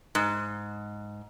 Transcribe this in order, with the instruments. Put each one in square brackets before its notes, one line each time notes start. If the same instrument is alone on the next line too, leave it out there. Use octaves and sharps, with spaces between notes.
[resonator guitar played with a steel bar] G#2